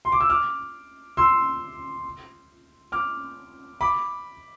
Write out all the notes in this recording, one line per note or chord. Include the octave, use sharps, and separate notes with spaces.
C6
D6
E6
D6 F6
C6 E6
D6 F6
B5 D6